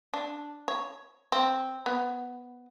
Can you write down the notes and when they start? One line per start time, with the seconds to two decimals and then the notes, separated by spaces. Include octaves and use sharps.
0.14 D4
0.68 C#5
1.32 C4
1.86 B3